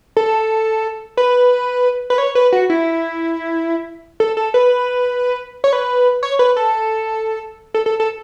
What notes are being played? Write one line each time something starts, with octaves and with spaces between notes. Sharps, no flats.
A4
B4
B4
C#5
B4
F#4
E4
A4
A4
B4
C#5
B4
C#5
B4
A4
A4
A4
A4